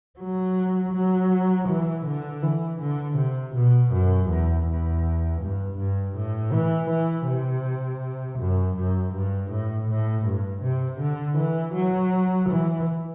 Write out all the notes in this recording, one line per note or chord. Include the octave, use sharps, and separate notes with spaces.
F#3
F#3
E3
D3
E3
D3
C3
B2
F#2
E2
E2
G2
G2
A2
E3
E3
C3
F#2
F#2
G2
A2
A2
G2
C3
D3
E3
F#3
E3